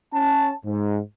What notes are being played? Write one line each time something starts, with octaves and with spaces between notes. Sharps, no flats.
C#4 A5
G#2